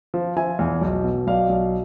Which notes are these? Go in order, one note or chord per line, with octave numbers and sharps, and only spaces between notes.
F3
F3 E5 G#5
E2
B1
B2
B1 D5 F5
B1